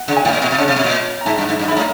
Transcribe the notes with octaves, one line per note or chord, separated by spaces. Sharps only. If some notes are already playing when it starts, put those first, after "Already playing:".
Already playing: F#5
C#3
G#5
A2 G5
A#2
B2
C3
C#3 A5
C3
B2
A#2
A#5
G#2 A5
G2
G#2
G2
G#2 B5
A2 A#5